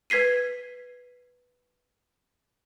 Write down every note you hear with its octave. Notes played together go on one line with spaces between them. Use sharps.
B4 G#6 B6 C7 D#7